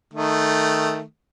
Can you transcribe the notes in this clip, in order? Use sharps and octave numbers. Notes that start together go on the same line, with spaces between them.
D#3 A3